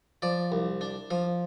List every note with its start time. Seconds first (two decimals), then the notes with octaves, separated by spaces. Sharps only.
0.22 F3 D5
0.52 C2
0.81 D4
1.10 F3 F5